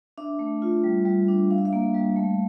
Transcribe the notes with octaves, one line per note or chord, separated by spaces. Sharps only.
D4 E5
A3
F4
G3
G3
D4
D4 F5
E5
F5
A#3
G3
A3